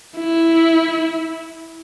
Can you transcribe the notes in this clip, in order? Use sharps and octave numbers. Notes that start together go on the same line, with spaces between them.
E4